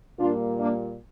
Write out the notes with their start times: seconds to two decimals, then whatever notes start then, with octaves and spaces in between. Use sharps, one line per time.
0.18 A#2 G3 A#3 D4 F4
0.58 A#3 D4